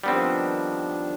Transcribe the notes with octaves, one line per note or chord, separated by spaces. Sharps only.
D#3 F3 G3 B3 C4 D4